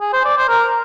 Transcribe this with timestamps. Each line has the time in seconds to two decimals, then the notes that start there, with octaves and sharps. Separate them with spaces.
0.01 G#4
0.13 C5
0.25 D5
0.37 C5
0.49 A#4